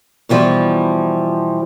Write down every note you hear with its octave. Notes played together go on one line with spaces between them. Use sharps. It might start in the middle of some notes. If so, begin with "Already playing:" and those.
B2 E3 F3 G3